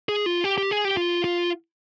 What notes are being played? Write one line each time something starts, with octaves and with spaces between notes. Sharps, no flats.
G#4
F4
G4
G4
G#4
G4
F4
F4